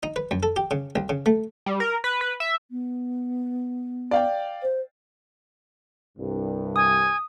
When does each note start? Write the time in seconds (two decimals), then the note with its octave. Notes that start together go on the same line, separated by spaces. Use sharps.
0.03 D#4
0.16 B4
0.31 F#2
0.43 A4
0.56 G4
0.71 C#3
0.96 C2
1.09 C#3
1.26 A3
1.66 G3
1.80 A#4
2.04 B4
2.21 B4
2.40 E5
2.71 B3
4.11 D5 F5 G5
4.63 C5
6.18 C2 G2
6.76 G#5 D#6